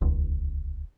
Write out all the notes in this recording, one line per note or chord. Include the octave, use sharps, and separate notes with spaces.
D#1 C#2